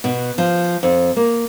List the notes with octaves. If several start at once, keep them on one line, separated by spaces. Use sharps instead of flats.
B2
F3
F2
A#3